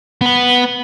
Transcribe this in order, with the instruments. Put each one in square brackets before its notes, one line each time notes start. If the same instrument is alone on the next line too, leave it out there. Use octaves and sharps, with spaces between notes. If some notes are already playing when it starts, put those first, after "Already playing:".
[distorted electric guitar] B3 B4